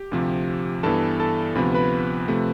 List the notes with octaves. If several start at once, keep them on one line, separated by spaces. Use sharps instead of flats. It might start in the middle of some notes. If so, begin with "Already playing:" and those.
Already playing: G4
D2 C3 F3
G2 E3 B3 A4 A5
A4 A5
D2 C3 F3 B3 B5
B4 B5
C3 F3 A3